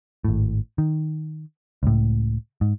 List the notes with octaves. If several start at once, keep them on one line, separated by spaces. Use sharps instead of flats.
G#1 A2
D#3
C#2 A2
G#2